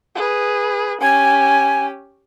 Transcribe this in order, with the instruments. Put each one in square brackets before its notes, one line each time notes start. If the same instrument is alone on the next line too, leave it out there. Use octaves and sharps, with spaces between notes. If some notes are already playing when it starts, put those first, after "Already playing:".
[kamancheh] G#4 B4
[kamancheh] C#4 G4 [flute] G#5